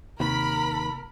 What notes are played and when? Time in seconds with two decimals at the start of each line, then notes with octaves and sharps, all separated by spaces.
0.20 D#2 C3 A#4 B5